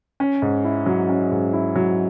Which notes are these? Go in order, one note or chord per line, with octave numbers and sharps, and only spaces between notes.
C#4
G#2
E4
F#3
C#4
G#2
E4
F#3